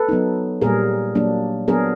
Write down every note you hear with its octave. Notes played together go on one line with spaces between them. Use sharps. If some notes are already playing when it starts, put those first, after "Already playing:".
Already playing: A4 B4
F#3 B3 D#4
A#2 G3 A#3 G#4 A#4
F#3 A#3 D4
F#3 B3 D4 G#4 A#4